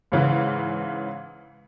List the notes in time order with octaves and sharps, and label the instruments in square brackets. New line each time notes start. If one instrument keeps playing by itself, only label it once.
[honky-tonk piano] G#2 C#3 E3